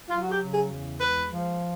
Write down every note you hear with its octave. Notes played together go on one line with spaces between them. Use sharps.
F#3 F4
F#4
G4
C#3
G#4
E2
G#3 B4
F3